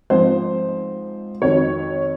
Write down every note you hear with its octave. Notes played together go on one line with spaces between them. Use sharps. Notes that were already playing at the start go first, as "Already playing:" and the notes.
G#2 F3 C4 C5
F2 D#3 F#3 C#5